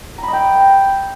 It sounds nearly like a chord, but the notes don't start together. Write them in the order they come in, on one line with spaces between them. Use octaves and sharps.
A#5 B5 D#5 G5